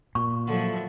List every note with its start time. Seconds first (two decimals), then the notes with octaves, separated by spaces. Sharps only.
0.15 A#2 C#6
0.48 D3 F3 F#3 E4